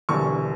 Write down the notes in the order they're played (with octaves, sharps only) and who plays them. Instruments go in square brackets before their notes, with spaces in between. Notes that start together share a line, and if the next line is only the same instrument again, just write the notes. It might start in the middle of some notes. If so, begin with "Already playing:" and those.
[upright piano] E1 E2 D3 G3 C#6